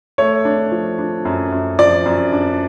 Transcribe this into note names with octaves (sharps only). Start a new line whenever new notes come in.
A3 C#5
D4
F3
D4
F#2
F#2
F3 D5
F#2
D4